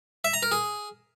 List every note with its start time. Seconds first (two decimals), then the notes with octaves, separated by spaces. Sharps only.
0.24 E5
0.34 A#5
0.43 A#4
0.52 G#4